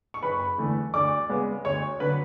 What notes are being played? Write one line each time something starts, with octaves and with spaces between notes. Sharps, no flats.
C#6
F#1 B4 B5
E2 D3 A3
D2 D5 D6
C#3 G#3 B3
D2 C#5 C#6
D3 F#3 B4 B5